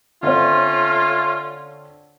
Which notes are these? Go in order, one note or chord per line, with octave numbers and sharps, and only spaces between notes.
D3 A3 C4 C#4 F4 C#5